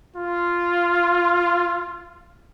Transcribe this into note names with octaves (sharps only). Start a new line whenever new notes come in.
F4